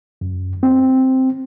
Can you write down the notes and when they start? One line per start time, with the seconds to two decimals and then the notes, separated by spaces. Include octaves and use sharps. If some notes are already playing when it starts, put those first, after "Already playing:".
0.21 F#2
0.63 C4